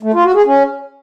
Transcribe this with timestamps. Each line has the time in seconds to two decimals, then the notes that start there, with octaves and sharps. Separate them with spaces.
0.03 A3
0.14 F4
0.24 F#4
0.35 G#4
0.46 C#4